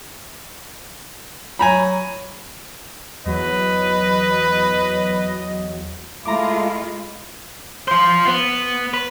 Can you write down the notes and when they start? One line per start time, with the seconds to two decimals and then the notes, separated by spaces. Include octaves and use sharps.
1.59 F#3 G#5 A#5 B5
3.26 E2 F#3 B4 D#5
6.25 G#3 A3 E4 F4 A#5 D6
7.88 F4 C5
8.26 B3
8.94 B4